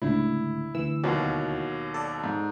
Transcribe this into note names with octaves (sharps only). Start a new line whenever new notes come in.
C#2 A2 D3 E4
D2 E3 E6
D#2 B2 F#3
A4 D5
G#2